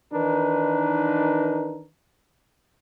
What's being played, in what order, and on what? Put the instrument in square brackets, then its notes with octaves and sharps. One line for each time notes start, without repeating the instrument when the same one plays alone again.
[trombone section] D#3 E3 D4 D#4 A#4 B4